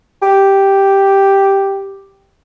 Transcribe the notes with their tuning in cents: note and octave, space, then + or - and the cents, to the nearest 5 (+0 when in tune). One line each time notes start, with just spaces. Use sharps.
G4 +0